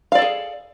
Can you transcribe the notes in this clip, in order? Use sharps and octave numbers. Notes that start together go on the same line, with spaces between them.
G#4 A4 D5 F5